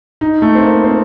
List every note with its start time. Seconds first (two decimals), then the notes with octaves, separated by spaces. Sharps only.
0.21 D#4
0.42 A3
0.55 C4
0.63 A#3
0.84 C4